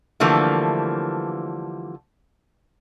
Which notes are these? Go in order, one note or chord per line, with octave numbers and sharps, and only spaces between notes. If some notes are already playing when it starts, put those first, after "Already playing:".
D3 E3 F3 G3 A3 A#3